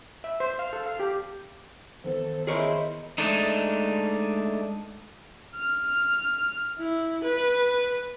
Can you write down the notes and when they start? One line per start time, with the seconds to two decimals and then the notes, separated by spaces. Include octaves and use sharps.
0.24 E5
0.40 C5
0.59 F5
0.73 A4
0.86 F5
1.00 G4
2.04 D#3 E3 B3 A4 C5
2.47 E4 G#4 A#4 C5 C#5 D#5
3.18 G#3 A3 D4 D#4
5.56 F6
6.79 E4
7.24 B4